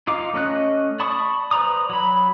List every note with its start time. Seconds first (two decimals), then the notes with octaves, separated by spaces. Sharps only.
0.07 D#4 F4 F5 D6
0.34 A3 C#4 D#5 F#6
1.00 D5 A5 B5 C#6 D#6
1.51 B4 C5 D5 A#5 D#6
1.89 F#3 B5